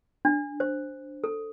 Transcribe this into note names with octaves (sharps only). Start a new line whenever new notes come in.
D4
C5
A4